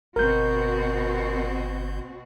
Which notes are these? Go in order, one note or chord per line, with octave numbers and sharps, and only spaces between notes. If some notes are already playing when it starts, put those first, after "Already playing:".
G1 B2 C4 F#4 A#4 G6